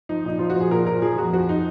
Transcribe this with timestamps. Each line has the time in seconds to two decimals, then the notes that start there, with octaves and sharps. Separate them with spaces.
0.09 F3 D#4
0.25 A#2 D#4
0.39 F3 F4
0.50 F#4
0.56 F3 G#4
0.71 A#2 A#4
0.87 A#2 A#4
1.02 F3 G#4
1.17 F2 F#4
1.33 F3 F#4
1.49 D#4